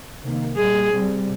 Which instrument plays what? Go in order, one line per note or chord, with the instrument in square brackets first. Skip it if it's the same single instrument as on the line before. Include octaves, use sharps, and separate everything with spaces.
[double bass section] C3 D#3 A#3
[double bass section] A#2 G3 A#3 [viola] G#4
[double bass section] C3 G3 C4